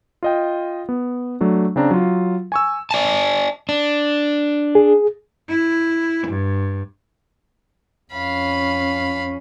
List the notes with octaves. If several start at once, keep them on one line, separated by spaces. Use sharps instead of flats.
F4 D#5 G5
B3
F#3 A3 D4
C#3 C4 D4 A#5
F#3 F4
G#5 C#6 E6
D5 G#5 A5
D4
G#4
E4
G2
F2 C#4 F5 B5